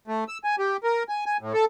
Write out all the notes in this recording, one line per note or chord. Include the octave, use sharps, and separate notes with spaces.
A3
E6
G#5
G4
A#4
G#5
G#5
A2
A4